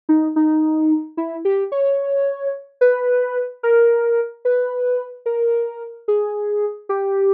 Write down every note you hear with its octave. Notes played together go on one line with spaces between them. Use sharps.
D#4
D#4
E4
G4
C#5
B4
A#4
B4
A#4
G#4
G4